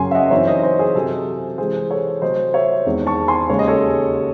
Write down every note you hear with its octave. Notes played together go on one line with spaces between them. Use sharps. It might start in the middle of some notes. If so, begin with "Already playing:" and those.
Already playing: F#2 C#3 F#3 C#4 G#5 C6
E5
D#5 F#5
F#2 E3 C4 D#4 C#5 E5
C5 D#5
C5 D#5
G#4
C3 F#3 C4 A4
C3 E3 G#3 G#4 C5
A4 C#5
C3 F#3 A3 C4 C5 D#5
C#5 E5
E2 D#3 G#3 C4
A5 C#6
G#5 C6
D#2 C#3 G#3 C#5
D#5
A4 C#5